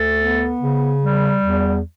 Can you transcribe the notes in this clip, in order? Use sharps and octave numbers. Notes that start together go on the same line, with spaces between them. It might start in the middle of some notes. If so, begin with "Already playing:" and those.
Already playing: D2 A4
B3
C#3
G3
E2